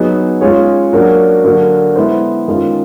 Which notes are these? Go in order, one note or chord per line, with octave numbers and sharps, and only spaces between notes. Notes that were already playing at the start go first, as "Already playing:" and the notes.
Already playing: F#3 B3 D#4 G#4
G#3 C#4 F4 G#4 C#5
F#3 A#3 D4 F#4
D3 F#3 A#3 D4 F#4
G#3 B3 E4 A4 C5
D#3 G#3 C#4 F4